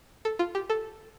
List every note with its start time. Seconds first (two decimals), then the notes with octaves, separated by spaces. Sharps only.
0.25 A4
0.39 F4
0.55 G4
0.70 A4